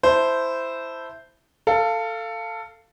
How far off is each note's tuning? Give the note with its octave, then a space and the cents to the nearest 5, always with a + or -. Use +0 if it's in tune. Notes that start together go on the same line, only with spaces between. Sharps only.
E4 +0 C5 -10 A5 +5
A4 +15 F5 -10